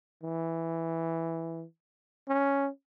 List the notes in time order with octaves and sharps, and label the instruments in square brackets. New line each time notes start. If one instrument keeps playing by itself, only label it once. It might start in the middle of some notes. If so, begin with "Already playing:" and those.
[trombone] E3
C#4